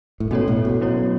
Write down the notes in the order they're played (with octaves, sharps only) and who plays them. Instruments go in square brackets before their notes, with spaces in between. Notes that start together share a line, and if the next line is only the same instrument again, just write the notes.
[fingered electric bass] A2
[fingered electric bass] B2 [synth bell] A3 C#4 A4 C#5
[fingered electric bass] A2
B2
[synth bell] F#3 C#4 E4 C#5